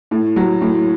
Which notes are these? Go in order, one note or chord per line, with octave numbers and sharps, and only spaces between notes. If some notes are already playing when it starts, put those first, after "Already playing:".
A2
F#3
A2